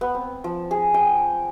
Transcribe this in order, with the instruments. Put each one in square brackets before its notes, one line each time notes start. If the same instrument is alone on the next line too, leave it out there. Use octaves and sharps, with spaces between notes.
[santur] B3
C4
F3
G#4
G5